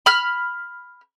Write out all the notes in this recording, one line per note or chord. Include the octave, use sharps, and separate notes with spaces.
B5 F6